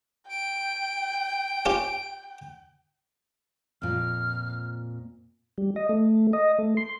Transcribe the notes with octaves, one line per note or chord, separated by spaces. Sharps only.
G5 D7
C#4 F4 G4
F2 A#2 F6
G3
D#5
A3
D#5
A3
C6